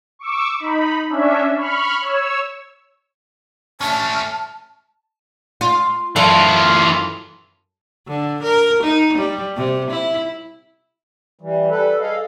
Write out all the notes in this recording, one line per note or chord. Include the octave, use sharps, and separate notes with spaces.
C#6 D6 E6
D#4 B5
C#4 D4 E5
B5 C#6 F6
C#5 E6
A3 C#4 A5 F6
F4
F#2 E3 F4 A4 F5
D3
A#4
D#4
G3
C3
E4
E3 G3
G3 A4 B4
G#4 A4 D#5 F5